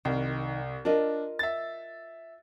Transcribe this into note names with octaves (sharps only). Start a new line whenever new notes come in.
C2 D#3
D4 F4 A#4 D#5
E5 A6